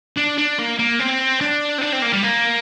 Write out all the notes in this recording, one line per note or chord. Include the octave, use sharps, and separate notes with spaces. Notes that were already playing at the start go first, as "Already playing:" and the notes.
D4
D4
A#3
A#3
C4
D4
C4
D4
C4
A#3
G3
A#3